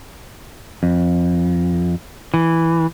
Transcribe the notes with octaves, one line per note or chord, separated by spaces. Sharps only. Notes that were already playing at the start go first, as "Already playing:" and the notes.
F2
E3